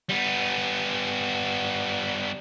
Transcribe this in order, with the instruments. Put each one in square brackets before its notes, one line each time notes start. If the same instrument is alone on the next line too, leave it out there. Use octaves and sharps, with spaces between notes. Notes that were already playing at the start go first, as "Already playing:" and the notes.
[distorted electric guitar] G3 B3